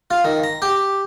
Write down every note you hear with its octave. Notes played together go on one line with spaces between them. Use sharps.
F4
D#3
A#5
G4